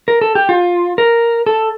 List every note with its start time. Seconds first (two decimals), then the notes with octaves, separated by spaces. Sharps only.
0.08 A#4
0.21 A4
0.35 G4
0.49 F4
0.98 A#4
1.46 A4